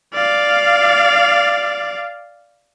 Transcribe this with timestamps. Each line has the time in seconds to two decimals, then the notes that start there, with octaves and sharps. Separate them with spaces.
0.14 D5 F5